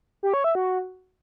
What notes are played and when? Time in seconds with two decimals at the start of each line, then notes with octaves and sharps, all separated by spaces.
0.23 G4
0.34 C#5
0.44 E5
0.55 F#4